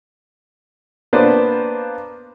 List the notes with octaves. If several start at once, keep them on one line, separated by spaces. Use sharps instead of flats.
A#3 B3 D4 B4 C5 D5